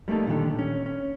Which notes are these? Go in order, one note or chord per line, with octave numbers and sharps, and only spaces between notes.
G3 A3 A#3 D#4 A4
A#2 D3 D#3 G4
C#4
C#4